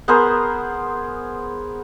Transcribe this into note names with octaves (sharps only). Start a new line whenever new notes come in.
B3 G#4 A#4 C5